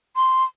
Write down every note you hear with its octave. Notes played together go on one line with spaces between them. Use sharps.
C6